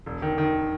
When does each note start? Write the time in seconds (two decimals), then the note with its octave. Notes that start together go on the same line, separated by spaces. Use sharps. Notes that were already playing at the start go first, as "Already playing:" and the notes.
0.06 E1
0.22 D#3
0.38 D#3